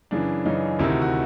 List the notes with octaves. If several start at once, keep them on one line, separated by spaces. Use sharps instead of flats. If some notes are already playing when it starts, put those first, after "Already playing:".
F#2 C#3 E3 D4
F#2 C#3 E3 D#4
D2 C3 D#3 E4
F#4
F#4